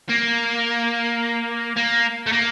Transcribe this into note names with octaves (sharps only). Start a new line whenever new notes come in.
A#3
A#3
A3
A#3